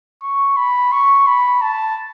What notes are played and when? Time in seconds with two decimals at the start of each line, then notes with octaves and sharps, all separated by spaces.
0.23 C#6
0.57 B5
0.92 C#6
1.27 B5
1.62 A5